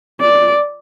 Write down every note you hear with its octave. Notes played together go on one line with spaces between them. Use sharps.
D5